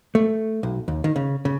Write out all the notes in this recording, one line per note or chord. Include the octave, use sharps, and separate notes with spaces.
A3
B1
D#2
D#3
C#3
C#3